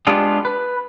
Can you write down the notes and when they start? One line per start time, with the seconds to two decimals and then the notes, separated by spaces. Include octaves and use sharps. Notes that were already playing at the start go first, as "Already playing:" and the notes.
0.07 G#3 B3 D4 F4 G4 G#4
0.45 B4